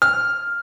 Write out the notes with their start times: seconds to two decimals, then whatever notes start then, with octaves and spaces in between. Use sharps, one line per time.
0.02 F6